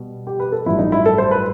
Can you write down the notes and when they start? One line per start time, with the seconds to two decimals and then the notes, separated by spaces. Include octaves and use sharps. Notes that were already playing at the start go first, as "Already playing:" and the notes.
Already playing: B2 G3
0.27 G4
0.40 B4
0.52 A4
0.66 A1 G2 F#3 E4
0.79 D#4
0.92 E4
1.06 A4
1.18 C5
1.31 B4